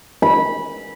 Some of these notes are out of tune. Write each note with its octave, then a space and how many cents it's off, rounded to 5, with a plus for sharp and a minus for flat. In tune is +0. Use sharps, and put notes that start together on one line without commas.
B5 -15